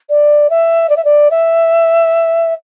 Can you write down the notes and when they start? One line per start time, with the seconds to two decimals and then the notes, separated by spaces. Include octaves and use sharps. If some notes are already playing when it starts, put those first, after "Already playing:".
0.10 D5
0.50 E5
0.89 D5
0.97 E5
1.05 D5
1.31 E5